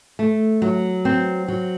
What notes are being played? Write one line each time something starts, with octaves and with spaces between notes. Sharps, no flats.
A3
F#3
C4
F#3